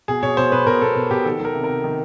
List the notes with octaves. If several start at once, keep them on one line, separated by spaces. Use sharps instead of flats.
B2 G#4
B2 C#5
B2 C5
B2 B4
B2 A#4
B2 A4
B2
B2 G4
D#3 A4
D#3 A#4
C3
A#4
C3
D#3